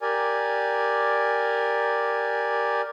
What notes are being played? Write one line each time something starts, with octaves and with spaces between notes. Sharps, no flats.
G4 A#4 D5 G#5